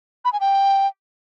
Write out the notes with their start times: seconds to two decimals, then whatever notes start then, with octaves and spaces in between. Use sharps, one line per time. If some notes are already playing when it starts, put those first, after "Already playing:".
0.25 B5
0.33 G#5
0.40 G5